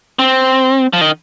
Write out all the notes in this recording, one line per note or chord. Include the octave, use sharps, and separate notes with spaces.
C4
F3
D#3